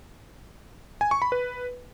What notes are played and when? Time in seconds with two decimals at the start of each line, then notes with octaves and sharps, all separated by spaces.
1.01 G#5
1.11 C#6
1.22 B5
1.32 B4